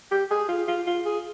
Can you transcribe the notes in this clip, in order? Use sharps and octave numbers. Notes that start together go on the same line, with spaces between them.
G4
G#4
F4
F4
F4
G#4